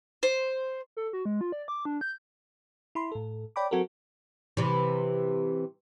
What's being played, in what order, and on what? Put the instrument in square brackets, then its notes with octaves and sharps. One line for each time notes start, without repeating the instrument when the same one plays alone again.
[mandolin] C5
[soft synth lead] A4
F#4
G#3
F4
D5
D6
D4
G6
[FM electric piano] E4 B5 C6
A2 A4
C#5 D5 G5 B5 D6
F#3 C4 F#4 A4 A#4
[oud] C3 E3